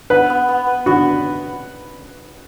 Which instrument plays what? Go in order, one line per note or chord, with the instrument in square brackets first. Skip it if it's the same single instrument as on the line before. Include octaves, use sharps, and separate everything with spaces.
[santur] B3 [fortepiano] B4
[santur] B3
B3
B4
[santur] B3 [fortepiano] F#4
[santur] B4